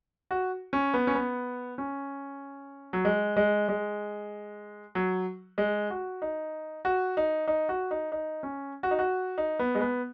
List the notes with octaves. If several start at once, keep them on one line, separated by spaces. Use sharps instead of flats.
F#4
C#4
B3
C#4
B3
C#4
F#3
G#3
G#3
G#3
F#3
G#3
F#4
D#4
F#4
D#4
D#4
F#4
D#4
D#4
C#4
F#4
D#4
F#4
D#4
B3
G#3
B3